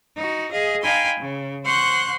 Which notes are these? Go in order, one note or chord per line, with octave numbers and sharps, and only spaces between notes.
D#4 F#4
G#4 D#5 F5
D#4 F5 G5 G#5 B5 C6
C#3
C5 F#5 C6 C#6 F#6 G6